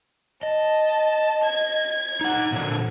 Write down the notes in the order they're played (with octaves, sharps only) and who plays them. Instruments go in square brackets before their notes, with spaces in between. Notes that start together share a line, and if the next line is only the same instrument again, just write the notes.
[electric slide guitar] D#5 [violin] A5
[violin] G#6
[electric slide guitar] D#4 F#5
A#2 D3 F3